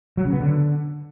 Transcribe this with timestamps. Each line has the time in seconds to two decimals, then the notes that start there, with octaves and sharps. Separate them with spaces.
0.17 F#3
0.25 C#3
0.33 B3
0.40 D3